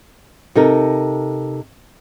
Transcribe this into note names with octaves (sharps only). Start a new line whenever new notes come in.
C3 D#4 A4 A#4